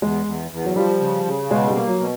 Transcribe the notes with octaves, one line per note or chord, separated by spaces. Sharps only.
E2 G#3
E2
E2
F#3
F3 G3
C#3
C#3
B2 G#3
G3
A#3
F#3
B2